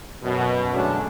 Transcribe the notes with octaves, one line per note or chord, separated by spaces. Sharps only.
F#2 B2
D3 F#3 G#3 A3 C#4 D4